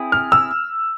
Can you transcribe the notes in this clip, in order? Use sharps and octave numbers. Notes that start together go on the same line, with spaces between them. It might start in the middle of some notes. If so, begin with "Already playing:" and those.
Already playing: C4 E4 G#4
F6
E6